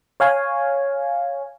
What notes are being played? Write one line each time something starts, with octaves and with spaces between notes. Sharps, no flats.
C#5 F5 G#5